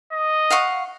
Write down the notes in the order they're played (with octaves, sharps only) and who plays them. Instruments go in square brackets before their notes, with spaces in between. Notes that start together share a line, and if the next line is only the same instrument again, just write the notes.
[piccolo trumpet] D#5
[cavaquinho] F5 F#5 C#6